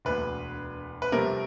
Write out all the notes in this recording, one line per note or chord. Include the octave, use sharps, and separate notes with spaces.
E1 D2 D3 B4
B4
C2 C3 F3 A3 C4 A#4